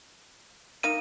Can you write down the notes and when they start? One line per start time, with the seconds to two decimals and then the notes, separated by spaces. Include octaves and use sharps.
0.83 A#3 D#4 D#7